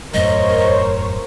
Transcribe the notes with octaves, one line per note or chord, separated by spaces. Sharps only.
E1 F#2 A2 A#4 C5 C#5 D#5